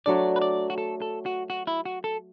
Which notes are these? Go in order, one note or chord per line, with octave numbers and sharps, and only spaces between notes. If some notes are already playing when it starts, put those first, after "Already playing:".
F#3 A3 D4 D5
B4
D5
F#4
A4
A4
F#4
F#4
E4
F#4
A4